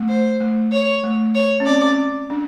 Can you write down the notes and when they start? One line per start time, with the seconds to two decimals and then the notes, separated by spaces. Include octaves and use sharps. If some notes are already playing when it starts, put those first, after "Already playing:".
Already playing: A3
0.09 C5
0.40 A3
0.72 C#5
1.03 A3
1.35 C#5
1.60 C#4
1.66 C4 D5
1.83 C#4
2.30 D4